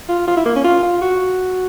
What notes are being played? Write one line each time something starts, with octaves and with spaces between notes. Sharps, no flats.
F4
F4
E4
A#3
C#4
F4
F4
F#4